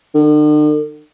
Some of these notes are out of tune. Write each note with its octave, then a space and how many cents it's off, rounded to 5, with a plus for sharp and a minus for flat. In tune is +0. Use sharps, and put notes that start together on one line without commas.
D3 +45